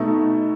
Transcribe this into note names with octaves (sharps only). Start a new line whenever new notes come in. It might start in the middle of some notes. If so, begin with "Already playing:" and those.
Already playing: B2 A3 D#4